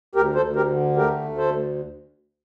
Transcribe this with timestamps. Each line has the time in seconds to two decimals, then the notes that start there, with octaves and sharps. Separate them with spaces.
0.15 D2 G4 A#4
0.35 A4 C5
0.42 D2
0.56 G4 A#4
0.70 D3
0.96 A3 G4 A#4
1.24 D2
1.38 A4 C5